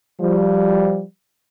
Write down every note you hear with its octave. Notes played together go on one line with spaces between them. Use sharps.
F3 G3